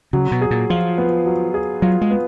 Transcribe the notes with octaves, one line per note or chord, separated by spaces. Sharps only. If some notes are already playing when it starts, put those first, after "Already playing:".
C#3 F#3
B2
G#4
A#2
F3 F4
B3
F#3
G#4
F#3 F4
G#3
B3